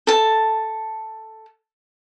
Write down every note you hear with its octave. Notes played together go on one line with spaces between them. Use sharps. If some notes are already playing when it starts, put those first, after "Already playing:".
A4 A5